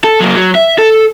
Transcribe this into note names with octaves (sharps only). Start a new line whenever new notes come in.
A4
F#3 A#3
F#3
E5
A4